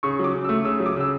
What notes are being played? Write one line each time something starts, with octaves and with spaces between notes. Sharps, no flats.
C#3 C#6
F#3 D6
C#3
E6
A3
C#3 E6
F#3
D6
C#3 E6